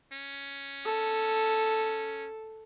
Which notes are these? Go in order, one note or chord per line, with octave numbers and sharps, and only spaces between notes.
C#4
A4